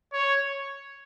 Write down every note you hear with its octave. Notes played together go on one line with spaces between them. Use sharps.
C#5